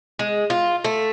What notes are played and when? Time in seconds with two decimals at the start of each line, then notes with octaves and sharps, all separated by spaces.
0.19 G#3
0.50 F4
0.84 A3